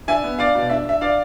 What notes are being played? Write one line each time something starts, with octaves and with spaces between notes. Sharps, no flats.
D4 E5 G#5
B3
D4 D5 F5
B2
D4 E5
D4 E5
D4 D5 F5